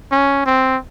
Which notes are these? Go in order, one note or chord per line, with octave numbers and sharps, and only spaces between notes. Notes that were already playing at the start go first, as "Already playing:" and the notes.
C#4
C4